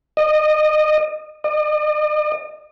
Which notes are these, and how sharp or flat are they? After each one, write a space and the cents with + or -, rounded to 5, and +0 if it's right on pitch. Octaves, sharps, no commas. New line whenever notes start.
D#5 -25
D#5 -45